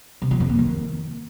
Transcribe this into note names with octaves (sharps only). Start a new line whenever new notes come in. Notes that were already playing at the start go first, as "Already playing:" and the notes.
C3
F3
F2
A#3
D#3